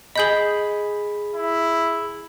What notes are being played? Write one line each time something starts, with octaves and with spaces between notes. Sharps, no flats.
G#4 D#5 B5 G6 F#7
E4